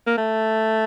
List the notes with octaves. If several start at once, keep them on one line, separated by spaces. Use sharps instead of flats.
A#3
A3